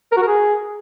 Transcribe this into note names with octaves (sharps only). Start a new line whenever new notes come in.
A#4
F#4
A#4
G#4